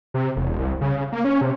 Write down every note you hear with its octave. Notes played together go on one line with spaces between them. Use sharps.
C3
E1
C2
C#3
A#3
C#4
C3